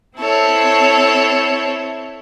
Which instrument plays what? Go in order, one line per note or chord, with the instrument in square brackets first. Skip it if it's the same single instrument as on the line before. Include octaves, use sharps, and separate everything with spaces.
[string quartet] C4 E4 A4 C#5